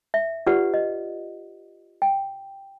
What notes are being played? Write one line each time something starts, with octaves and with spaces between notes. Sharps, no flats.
E5
F4 G4 B4 D5 F#5
D#5
G5